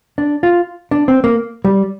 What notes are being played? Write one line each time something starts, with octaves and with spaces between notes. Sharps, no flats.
D4
F4
D4
C4
A#3
G3